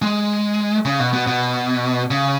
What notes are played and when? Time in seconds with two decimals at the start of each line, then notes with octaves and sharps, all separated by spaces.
0.02 G#3
0.85 C#3
1.00 B2
1.13 B2
1.27 B2
2.11 C#3